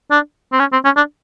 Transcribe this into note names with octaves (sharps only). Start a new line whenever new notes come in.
D4
C4
C#4
C4
C#4
D4